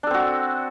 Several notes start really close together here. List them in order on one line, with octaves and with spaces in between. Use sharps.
D4 A4 C4 F#4